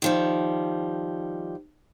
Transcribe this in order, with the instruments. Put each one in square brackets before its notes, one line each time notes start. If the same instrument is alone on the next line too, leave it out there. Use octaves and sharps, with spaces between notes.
[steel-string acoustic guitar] D#3 F3 G3